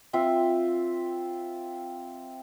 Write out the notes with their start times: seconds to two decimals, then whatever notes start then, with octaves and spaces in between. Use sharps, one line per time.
0.13 C4 F4 E5